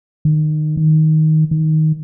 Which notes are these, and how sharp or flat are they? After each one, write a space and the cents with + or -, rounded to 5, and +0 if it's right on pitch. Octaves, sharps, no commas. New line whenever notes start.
D#3 -25
D#3 +10
D#3 +10